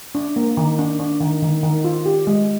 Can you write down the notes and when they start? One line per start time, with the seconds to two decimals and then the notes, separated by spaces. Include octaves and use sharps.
0.15 D4
0.36 A#3
0.57 D#3
0.79 D4
0.99 D4
1.21 D#3
1.42 D#3
1.63 D#3
1.84 F4
2.06 G4
2.27 G#3